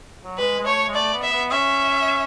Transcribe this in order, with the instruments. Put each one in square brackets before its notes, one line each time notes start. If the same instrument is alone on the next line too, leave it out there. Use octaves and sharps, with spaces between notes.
[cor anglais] F#3
[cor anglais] G#3 [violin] B4
[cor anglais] G#3
[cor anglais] A3 [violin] C#5
[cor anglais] G#3
[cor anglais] A3 [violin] D5
[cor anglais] B3
[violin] E5
[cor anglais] B3
[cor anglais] C#4 [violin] E5